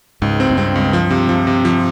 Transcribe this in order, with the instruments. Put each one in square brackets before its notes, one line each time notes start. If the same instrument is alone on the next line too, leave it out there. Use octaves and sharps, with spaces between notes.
[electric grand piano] C#2 [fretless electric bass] G#2
[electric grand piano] C4
[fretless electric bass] G#2
[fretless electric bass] G2 [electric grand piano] C4
[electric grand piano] C#2
F3
C3
F3
C3
F3